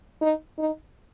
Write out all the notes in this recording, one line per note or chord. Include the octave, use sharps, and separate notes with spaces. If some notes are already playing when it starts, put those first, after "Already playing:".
D#4
D#4